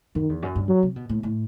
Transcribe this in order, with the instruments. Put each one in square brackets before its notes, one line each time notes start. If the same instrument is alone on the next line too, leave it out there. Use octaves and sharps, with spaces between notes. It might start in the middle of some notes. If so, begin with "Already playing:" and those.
[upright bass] F#2 [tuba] D#3
[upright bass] E2
F#2
G2
[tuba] F#3
[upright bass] C3
B2
A2
A2